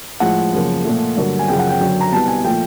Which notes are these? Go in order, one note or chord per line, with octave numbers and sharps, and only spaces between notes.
A2 F3 G#3 F#5
F#2 C#3 F3 A#3
A#2 F3 A3
G2 D3 F#3 A#3
G#5
F#2 C#3 F3 G5
F#5
G5
F#2 D3 F#3 G5
A#5
C2 B2 G3 B3 A5
G#5
A#2 F3 A3 G5